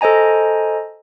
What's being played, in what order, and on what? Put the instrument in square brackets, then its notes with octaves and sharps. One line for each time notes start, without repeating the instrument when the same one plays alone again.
[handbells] A4 C5 D#5 G#5 A#5